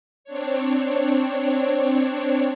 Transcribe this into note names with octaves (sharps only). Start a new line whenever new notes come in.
C4 D4 C#5